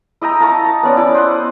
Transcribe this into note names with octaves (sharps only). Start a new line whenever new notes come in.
E4 D#5 G5 A#5
F5 A5 A#5 C#6
B3 C#4 D5
E4 B5 D6
C5 D#5 F#5